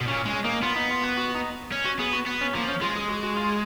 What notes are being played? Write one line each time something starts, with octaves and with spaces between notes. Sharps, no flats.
B2
A#2 C#4
G#3 C#4
A#3 D#4
B3 F4
D#4
F4
F#4
F#4
D#4
C#4
F#4
B3 G#4
F#4
B3
C#4
F3 A#3
C#4
G#3 F4
G#4
F#4
F#4
F4